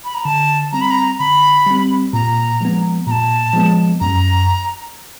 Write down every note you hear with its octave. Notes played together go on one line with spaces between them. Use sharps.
B5
A#5
D3 A5
G3 C4 A#5
B5
A#5
D3 B5
G3 C4
A#2 A#5
F3 G#3 B3
A#2 A5 A#5
F3 G#3 B3
F#2 A#5